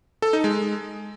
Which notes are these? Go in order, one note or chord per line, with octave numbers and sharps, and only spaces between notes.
A4
D#4
G#3